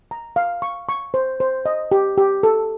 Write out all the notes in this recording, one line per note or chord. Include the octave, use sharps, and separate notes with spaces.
A#5
F5
C#6
C#6
C5
C5
D#5
G4
G4
A4